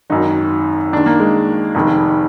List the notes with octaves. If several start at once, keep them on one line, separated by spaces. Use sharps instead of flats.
G#1 F#2 D#3 D#4
D#2 D#3 D4
A#3
G#3
F1 F2 D#3